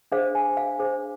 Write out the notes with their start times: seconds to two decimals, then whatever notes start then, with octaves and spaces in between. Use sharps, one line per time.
0.12 D4 G#4 C5 F5
0.35 G#5
0.57 F5
0.79 D4 G#4 C5